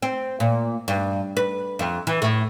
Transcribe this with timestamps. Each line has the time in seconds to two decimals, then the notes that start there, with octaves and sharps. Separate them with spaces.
0.02 C4
0.40 A#2
0.88 G2
1.37 B4
1.79 F2
2.07 E3
2.22 A2